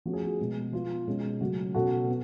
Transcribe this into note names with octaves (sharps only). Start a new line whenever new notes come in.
F3 A3 C#4 F#4
G#4
F#4
B2 G#3 B3
F3 B3 F4
B2 G#3 C#4
C#3 F#3 A3 C#4 F#4
B2 A3 C#4 F#4 A4
B3